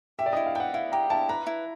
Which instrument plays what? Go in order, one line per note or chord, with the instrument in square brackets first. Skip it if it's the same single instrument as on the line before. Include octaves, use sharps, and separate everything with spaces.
[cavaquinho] G4 [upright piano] E5
[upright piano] D5
[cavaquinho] E4 [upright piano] D#5
[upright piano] F5
[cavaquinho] B4 [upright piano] G5
[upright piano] F#5
[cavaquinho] E4 [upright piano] F5
[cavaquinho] G4 [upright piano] A#5
[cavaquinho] E4 [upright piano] A5
[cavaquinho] B4 [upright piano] A#5
[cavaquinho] E4